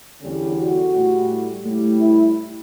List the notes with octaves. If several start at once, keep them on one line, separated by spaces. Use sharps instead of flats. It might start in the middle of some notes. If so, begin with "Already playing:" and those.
E2 D3 G3 C#4
F#4
A2 G3
A2 G3
E4